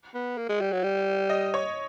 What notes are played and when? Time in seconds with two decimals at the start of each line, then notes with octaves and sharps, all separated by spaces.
0.14 B3
0.38 A#3
0.49 G#3
0.61 G3
0.72 F#3
0.83 G3
1.30 D#5
1.54 C#5